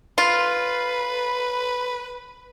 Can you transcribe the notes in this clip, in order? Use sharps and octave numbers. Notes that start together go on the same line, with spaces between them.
F4 B4